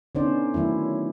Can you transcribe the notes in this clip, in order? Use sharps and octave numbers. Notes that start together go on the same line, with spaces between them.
D3 B3 C#4 D#4 C5 D5
D#3 F#3 A3 E4